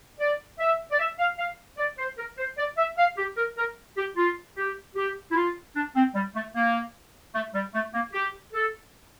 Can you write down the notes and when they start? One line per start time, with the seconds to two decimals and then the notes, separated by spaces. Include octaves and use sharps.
0.20 D5
0.59 E5
0.92 D5
0.99 E5
1.19 F5
1.39 F5
1.78 D5
1.98 C5
2.18 A#4
2.38 C5
2.58 D5
2.77 E5
2.98 F5
3.17 G4
3.37 A#4
3.57 A#4
3.97 G4
4.17 F4
4.57 G4
4.96 G4
5.31 E4
5.36 F4
5.76 D4
5.96 C4
6.15 G3
6.35 A3
6.55 A#3
7.34 A3
7.54 G3
7.74 A3
7.94 A#3
8.13 G4
8.54 A4